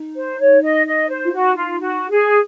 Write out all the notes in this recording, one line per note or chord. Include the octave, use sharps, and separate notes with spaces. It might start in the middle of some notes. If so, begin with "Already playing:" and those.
Already playing: D#4
C5
C#5
D#5
D#5
C5
F4
F#4
F4
F#4
G#4